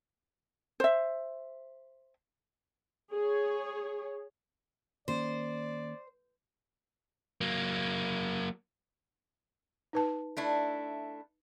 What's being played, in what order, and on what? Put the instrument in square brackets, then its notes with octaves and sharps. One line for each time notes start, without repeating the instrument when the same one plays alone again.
[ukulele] C5 E5
[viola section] G#4 C#5
[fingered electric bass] D#3 A#3 C#4 [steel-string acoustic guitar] C5 [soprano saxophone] D5
[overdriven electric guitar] F#3 A#3
[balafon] D#4 B4 A5
[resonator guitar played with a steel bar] A3 D4 E4